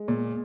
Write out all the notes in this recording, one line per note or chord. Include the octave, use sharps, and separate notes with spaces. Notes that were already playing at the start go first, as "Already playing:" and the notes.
Already playing: G#3
A#2